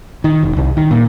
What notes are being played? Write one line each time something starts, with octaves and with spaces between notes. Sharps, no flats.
D#3
E1
C2
D#3
A#2